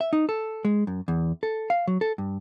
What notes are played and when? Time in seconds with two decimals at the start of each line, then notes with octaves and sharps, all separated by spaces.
0.01 E5
0.13 D#4
0.29 A4
0.65 G#3
0.87 F#2
1.08 E2
1.43 A4
1.70 F5
1.87 F#3
2.01 A4
2.18 G2